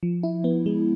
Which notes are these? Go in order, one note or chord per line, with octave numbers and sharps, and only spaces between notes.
F3
E4
B3
G#3